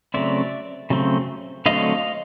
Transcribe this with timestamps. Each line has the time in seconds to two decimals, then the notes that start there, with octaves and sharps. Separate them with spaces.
0.14 C#3 F#3 A3 C4 D5 E5
0.90 C#3 F#3 A3 C4
1.66 D3 F#3 A3 C4 D#5 F5